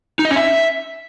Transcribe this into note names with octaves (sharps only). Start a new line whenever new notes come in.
D#4
D#5
C#4
E5